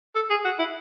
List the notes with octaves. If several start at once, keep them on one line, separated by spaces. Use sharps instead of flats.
A4
G#4
F#4
E4